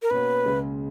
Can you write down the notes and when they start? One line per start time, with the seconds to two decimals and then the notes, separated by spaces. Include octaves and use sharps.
0.02 A#4
0.10 B2 A#3 C#4 F#4 B4
0.45 C#2 C#3 G#3